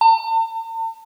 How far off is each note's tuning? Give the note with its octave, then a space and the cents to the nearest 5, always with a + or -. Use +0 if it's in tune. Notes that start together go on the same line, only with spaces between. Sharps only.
A5 +45